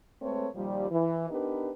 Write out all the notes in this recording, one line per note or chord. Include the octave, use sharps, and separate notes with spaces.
G#3 A3 C4 A4 B4 C#5
A#2 D#3 F3 G3
E3
B3 D4 D#4 G4 A#4 B4